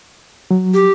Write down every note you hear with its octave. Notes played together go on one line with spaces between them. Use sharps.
F#3
G4